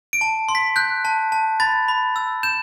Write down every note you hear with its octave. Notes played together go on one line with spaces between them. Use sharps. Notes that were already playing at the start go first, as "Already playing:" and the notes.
D7
A5
C6
B6
F#6 G6
A5
A5
B5 A6
B5
E6
G6 E7